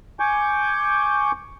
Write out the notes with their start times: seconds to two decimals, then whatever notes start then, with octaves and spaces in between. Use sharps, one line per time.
0.20 G#5 C#6 D6 G6